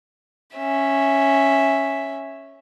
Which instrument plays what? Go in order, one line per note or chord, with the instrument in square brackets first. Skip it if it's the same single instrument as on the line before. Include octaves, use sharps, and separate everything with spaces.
[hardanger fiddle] C#4 E5